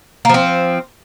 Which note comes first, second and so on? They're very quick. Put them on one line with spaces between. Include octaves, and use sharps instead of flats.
A#3 F3 C4